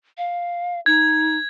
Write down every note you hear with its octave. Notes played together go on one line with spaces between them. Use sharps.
F5
D#4 G#6